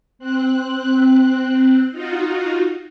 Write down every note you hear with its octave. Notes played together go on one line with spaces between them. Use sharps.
C4 F#6
D#4 F4 F#4